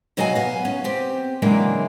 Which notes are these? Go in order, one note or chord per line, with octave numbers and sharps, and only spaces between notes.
B2 F#3 F#4 D#5 F5 G#5
B3 F5
C#4
C4 G4
C#3 E3 F#3 G#3 A#3 D4